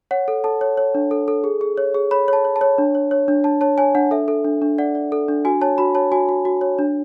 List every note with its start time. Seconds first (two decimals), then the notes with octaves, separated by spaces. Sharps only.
0.11 C#5 F#5
0.28 A4
0.44 A4 A5
0.61 C#5
0.77 C#5
0.95 D4
1.11 A4
1.28 A4
1.44 G#4
1.61 G#4
1.78 C#5
1.95 G#4
2.11 C#5 B5
2.28 C#5 A5
2.45 C#5
2.56 A5
2.61 C#5
2.78 D4
2.95 C#5
3.11 C#5
3.28 D4
3.44 D4 A5
3.61 C#5 A5
3.78 C#5 G#5
3.95 D4 F#5
4.11 A4 E5
4.28 A4
4.44 D4
4.62 D4
4.78 D5 F#5
4.95 D5
5.12 A4
5.28 D4
5.45 F#4 G#5
5.61 C#5 A5
5.78 F#4 B5
5.95 C#5 A5
6.12 F#4 G#5
6.29 F#4
6.45 F#4
6.61 C#5
6.79 D4